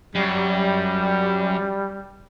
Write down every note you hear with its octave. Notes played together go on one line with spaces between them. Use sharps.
F#2 G3